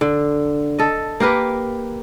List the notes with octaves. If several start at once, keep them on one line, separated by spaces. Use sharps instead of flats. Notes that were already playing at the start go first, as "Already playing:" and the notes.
D3
A4 D#5
A#3 G4 A#4 B4